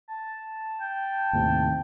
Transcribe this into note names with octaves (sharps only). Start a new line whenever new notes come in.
A5
G5
D#2 A2 C3